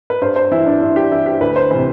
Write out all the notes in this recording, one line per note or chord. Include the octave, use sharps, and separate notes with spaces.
B4
G2 C5
C5
E3 E4
D4
G2 E4
G4
E3 E4
G4
D2 B4
C5
C3 E3 B4